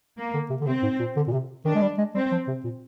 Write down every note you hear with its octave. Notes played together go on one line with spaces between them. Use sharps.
A#3
D3
C3
D3
C3 C4
G#2
A#2
D3
A#2
C3
D#3 D4
G#3
G3
G#3
G3 C4
F3
C3
A#2